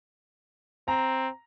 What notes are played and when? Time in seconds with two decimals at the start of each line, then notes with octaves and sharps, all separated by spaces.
0.88 C4 A#5